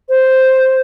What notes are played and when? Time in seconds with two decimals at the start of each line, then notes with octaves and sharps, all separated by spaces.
0.09 C5